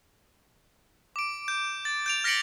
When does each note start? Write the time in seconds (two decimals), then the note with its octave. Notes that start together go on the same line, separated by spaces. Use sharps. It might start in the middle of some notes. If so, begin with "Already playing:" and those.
1.16 D6 D7
1.48 G6
1.85 A6
2.06 G6 D7 F7
2.24 F6 A#6 B6 C#7 D7 F#7